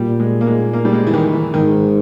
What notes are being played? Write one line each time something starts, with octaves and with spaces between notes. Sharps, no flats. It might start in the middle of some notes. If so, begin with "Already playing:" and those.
Already playing: A#2 G3
G#3
A#3
G#3
A#3
G3
G#3
E3
D#3
E3
G#2 D#3